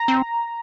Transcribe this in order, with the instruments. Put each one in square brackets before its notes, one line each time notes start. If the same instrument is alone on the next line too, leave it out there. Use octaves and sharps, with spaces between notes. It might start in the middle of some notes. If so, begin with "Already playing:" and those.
Already playing: [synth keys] A#5
[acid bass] C4